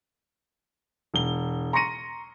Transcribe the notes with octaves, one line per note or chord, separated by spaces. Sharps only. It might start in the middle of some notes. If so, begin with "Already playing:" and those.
E1 G7
A#5 C6 C#6 A#6 C#7 D#7